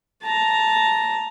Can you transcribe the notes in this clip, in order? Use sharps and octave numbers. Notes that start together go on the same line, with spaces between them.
A5 A#5